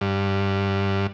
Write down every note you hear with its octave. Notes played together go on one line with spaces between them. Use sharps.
G2